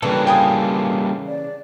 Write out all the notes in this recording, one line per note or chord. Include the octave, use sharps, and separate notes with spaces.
C#3 E3 G3 A#3 D4 A4 B4
F5 G5 G#5 D#6
D5